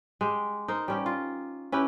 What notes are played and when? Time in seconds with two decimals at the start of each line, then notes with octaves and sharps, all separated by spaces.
0.21 G#3 G4
0.68 D#4 A#4 C5
0.88 G3 C#4 G4
1.06 F4
1.72 C#4 E4 G4 B4